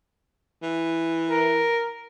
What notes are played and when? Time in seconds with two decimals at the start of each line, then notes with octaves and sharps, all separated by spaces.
0.63 E3
1.30 A#4